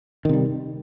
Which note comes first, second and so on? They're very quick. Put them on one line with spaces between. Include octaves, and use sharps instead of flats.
D#3 C3 G3